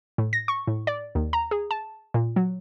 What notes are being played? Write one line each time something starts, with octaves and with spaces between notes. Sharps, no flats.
A2
A#6
C#6
A2
D5
D#2
A#5
G#4
A5
A#2
F#3